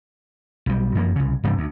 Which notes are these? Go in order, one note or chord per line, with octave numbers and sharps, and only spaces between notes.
B1 G3
F#2 F3 A3 A#3
C2 C#3
G2 C3 E3 G3
D2